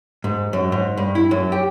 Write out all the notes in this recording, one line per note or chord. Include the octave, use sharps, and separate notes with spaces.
G#2
F#2
G#2
G2
E4
F#2
G4